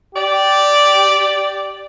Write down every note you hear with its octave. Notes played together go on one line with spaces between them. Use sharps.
G4 D5